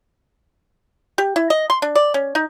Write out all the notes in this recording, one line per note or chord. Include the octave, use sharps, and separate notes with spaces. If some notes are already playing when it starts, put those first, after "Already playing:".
G4
E4
D#5
C6
D4
D5
C#4
D#4